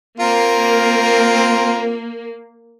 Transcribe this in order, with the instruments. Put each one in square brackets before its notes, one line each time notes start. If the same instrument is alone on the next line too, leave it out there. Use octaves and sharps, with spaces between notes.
[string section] A#3 [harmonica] C4 F4 A#4